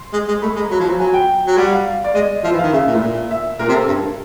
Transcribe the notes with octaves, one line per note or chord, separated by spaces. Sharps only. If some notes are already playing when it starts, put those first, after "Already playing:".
Already playing: C6
G#3
G#3
A3 B5
G#3
A#5
F#3 B5
F3
F#3 A#5
F#3 G#5
G5
F#3
G3 F#5
F5
D5
G#3 D#5
F3 E5
E3
D#3 F5
C#3 E5
A#2
A2
A#2
E5
A#2 A#4
C3
A4
G2